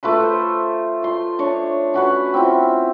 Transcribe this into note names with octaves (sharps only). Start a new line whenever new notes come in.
A3 F4 B4 C6
C5
F4 C6
D4 C#5
C#4 F#4 B4
C4 E4 F4